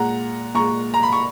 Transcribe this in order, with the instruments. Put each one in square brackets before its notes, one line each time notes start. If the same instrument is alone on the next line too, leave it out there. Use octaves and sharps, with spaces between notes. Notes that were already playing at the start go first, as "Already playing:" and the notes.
Already playing: [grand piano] A#2 G#3 F#5 A#5
A#2 G#3 A#5 C#6
A#5
B5
C#6